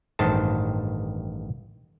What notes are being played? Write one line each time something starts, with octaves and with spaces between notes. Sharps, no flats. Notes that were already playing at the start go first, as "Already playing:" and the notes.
A1 G2 D#3 C5 A5